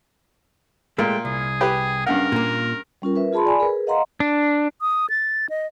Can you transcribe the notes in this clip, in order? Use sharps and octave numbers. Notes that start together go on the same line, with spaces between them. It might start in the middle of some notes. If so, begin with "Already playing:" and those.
A#2 G#3 A3 G5
C2 G#4
G4 B4
G2 C#3 A#4 F#5
A#2 A#3
G3 C#4 F4 A#4
A#4 B4 E5
F4 G#4 A5 B5 C6
D5 G#5 B5
G#4 A#4 B4
D#5 F5 F#5 A#5 C6
D4
D#6
A6
D#5